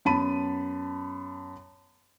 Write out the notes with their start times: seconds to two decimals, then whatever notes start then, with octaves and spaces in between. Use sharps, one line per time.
0.05 F#2 B3 A5 B5 D#7